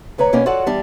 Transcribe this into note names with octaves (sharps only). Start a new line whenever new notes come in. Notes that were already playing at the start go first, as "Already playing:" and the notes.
D2 B4 C#5 A#5
B2 A#3 B3 C#4 D4
F4 F#4 A4 C#5 D5 F#5
E2 G3 D4